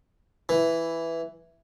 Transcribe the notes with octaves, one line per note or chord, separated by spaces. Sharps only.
E3